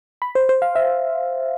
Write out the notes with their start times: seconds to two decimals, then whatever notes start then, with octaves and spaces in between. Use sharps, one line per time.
0.22 B5
0.35 C5
0.49 C5
0.62 F5
0.75 E5